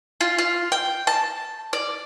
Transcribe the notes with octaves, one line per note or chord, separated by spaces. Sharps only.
F4
F4
G5
A5
D5